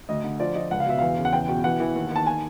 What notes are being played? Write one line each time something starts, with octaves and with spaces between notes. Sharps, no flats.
D2 D#5
D3
F3 D5
F3 D#5
C#2 F#5
F5
B2 E5
E2 F5
C#3
F#5
E2 G5
B2
E3 F#5
E3
D#2
D#3
A5
G#5